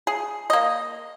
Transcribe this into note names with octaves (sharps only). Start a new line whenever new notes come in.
G#4
A#3 D#5